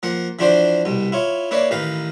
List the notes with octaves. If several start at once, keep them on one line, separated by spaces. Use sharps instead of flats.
F3 A#3 F#5
E3 F3 D4 F#4 C5 D5
C2 B2
E4 F4 C#5
A#3 E4 B4 C#5 D5
A1 D#3 B4 F5